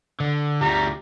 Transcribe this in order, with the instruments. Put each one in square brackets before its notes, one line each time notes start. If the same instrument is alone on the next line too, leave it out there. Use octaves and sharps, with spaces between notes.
[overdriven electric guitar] D3
[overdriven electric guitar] D2 G3 [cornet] A#5